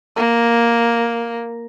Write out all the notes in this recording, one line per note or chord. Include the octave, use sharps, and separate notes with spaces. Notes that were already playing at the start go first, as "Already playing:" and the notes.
A#3